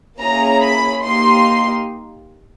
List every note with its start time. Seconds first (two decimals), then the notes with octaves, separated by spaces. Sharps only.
0.20 A#3 C#4 E4 G#4 A#5
0.62 B5
1.03 A#3 D#4 G4 C6